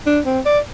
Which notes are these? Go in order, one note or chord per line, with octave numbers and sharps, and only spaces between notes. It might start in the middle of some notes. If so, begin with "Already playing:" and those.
D4
C4
D5